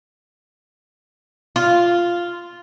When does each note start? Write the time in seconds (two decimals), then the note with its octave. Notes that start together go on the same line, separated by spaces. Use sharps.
1.56 F4